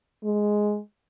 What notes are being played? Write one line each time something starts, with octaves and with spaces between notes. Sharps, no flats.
G#3